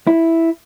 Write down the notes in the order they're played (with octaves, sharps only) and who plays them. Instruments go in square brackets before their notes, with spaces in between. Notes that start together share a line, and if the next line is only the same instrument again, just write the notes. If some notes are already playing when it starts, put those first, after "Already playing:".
[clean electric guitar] E4